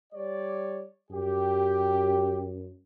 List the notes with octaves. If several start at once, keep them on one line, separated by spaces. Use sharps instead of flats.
G3 C#5 D5
F#2 G4